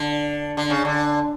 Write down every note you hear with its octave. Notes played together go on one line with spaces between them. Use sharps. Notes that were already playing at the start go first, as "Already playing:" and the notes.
Already playing: D3
D3
C#3
D3